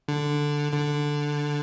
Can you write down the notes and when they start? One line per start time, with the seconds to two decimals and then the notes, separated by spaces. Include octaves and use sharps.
0.08 D3
0.72 D3